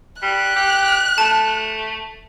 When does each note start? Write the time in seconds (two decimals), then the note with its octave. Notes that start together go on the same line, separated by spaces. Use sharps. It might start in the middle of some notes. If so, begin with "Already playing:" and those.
0.22 G3 F#6
0.56 G4
1.18 A3 A5